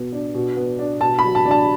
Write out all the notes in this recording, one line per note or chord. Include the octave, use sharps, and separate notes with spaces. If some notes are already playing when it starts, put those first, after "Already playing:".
Already playing: B2 B3
D4
B2
B3
D4
B2 A5
B5
F#3
A5
D4
A5